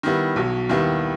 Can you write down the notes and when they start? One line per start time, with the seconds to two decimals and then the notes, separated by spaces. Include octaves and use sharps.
0.03 D#3 G3 B3 E4
0.36 B1 B2 F#3
0.69 D#2 D#3 G3 B3 E4